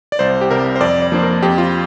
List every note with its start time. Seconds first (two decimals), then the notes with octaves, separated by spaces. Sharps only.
0.12 D5
0.19 C2 C5
0.41 G4
0.50 C3 G3 A#4
0.76 C5
0.80 F2 D5
1.02 D5
1.12 F3 A#3 D4 C5
1.23 A#4
1.43 F2 G4
1.58 F4